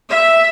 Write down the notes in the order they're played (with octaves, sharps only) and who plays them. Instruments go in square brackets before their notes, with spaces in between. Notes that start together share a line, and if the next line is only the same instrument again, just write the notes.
[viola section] E5